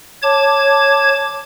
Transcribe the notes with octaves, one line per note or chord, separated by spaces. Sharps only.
C#5 A5 D6 G#6